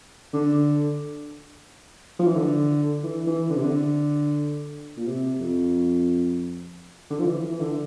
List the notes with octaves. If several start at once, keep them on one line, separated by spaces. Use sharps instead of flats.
D3
F3
E3
D3
E3
E3
D3
C3
D3
A#2
C3
F2
D3
F3
E3
E3
D3